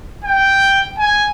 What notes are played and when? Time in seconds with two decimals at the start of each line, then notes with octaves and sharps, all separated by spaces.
0.24 G5
0.99 G#5